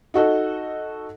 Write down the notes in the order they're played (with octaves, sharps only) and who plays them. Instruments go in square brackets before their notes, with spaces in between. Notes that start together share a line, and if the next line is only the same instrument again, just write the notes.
[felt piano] D#4 F#4 A4 D#5